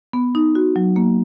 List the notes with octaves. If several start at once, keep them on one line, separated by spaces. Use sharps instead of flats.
B3
D#4
F#4
F#3
A#3